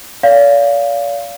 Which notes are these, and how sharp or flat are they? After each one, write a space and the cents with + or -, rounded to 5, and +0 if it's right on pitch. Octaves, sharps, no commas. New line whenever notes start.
D5 -45 F5 -10